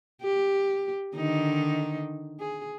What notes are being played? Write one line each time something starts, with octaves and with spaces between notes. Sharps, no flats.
G4
D3 D#3 D#4
G#4